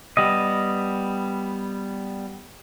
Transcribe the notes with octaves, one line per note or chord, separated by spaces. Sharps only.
G3 B3 D#5